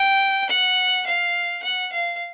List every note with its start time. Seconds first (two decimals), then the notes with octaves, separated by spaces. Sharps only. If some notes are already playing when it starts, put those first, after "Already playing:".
Already playing: G5
0.49 F#5
1.07 F5
1.63 F#5
1.93 F5